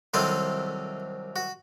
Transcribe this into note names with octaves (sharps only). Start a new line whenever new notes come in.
C2 C3 D#3 F#3 C4 A4
F#4